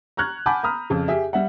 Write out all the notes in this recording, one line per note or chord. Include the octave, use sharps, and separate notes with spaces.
A#5 C#6 F6 F#6 G#6
F#5 G#5 A5 B5 D6 G6
A#5 B5 D#6 F6
F2 C#3
G4 G#4 E5
G3 E5 F#5